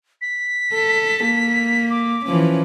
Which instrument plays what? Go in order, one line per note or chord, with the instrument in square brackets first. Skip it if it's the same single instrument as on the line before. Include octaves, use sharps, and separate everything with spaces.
[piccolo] B6
[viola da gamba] A4
A#3
[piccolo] D6
[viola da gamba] E3 F3 C#4